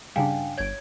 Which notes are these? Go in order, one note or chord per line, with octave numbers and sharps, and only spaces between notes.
G2 C#3 D4 F5 G5 G#5
G1 C#5 G#6 D7